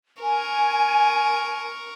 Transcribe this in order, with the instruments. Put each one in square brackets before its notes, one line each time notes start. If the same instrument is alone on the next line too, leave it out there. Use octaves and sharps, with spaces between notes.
[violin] A#4 C#6 [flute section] G#5